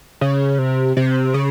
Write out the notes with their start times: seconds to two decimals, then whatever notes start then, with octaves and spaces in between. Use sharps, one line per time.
0.21 C#3
0.59 C3
0.97 C3
1.34 C#3